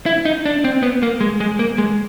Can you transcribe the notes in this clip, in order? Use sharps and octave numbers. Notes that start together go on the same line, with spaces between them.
E4
D#4
D4
C4
B3
A#3
G#3
G#3
A#3
G#3